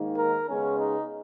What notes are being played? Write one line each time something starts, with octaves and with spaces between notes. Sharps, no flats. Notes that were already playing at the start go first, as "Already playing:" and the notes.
Already playing: G#2 D#3 A#3
A#4
C#3 G#3 B3 C#4
D#4